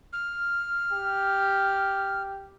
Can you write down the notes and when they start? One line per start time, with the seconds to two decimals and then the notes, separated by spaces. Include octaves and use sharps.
0.13 F6
0.93 G4